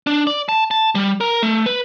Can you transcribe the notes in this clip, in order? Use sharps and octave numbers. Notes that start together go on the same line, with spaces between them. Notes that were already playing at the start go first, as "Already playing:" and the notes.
D4
D5
A5
A5
G3
A#4
A3
B4